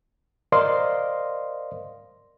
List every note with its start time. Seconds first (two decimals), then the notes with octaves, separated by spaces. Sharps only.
0.52 A#4 C5 D5 D#5 F5 C6